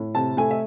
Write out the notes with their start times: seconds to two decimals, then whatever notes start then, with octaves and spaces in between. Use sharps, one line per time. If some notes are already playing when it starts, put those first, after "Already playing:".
Already playing: A2
0.15 C3 A5
0.37 A3 G#5
0.51 E5